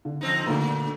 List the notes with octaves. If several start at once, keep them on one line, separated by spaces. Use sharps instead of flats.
D3
F3 C4 D#4
A#2 D3 A3 A#3